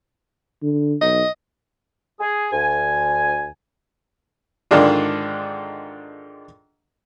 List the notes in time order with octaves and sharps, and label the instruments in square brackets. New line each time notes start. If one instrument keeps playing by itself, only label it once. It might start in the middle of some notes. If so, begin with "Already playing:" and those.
[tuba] D3
[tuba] B1 [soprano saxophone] D#5
[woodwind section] G#4
D2 G#5
[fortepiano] G#2 D3 D#3 G#3 D4 F4